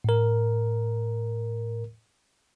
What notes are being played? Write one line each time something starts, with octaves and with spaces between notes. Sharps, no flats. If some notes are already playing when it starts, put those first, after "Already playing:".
A2 A#4